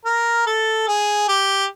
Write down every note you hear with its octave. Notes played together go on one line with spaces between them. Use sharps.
A#4
A4
G#4
G4